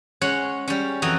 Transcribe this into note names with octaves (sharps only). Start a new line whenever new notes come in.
G#3 C#4 C#5 F#5
G3 C#4
F2 E3 F#4 D#5 A#5